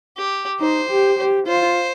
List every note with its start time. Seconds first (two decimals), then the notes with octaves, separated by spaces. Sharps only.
0.17 G4
0.60 D#4 C5
0.90 G4
1.19 G4
1.47 F4 C5